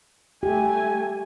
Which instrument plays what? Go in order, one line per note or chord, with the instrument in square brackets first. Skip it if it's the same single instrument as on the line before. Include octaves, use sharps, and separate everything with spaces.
[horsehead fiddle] A3 G#5 [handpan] G4